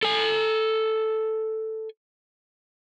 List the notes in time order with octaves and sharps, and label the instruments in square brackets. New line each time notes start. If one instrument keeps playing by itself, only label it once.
[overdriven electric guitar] A4 G#5